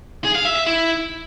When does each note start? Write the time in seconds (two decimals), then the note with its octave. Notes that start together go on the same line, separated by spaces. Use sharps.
0.25 G#4
0.35 F5
0.46 E5
0.56 E5
0.66 E4